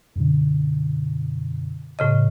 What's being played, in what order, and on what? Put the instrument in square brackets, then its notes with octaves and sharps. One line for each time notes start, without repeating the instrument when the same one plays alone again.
[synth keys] F#2 B2 D3
[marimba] A2 C#3 D#5